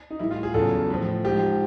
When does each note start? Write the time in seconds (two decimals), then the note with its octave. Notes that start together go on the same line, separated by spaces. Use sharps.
0.10 D#4
0.19 A2 E3 G3 E4
0.31 F4
0.43 G#4
0.54 E2 C#3 F#3 A4
0.90 A2 F3
1.24 G#2 F3 G4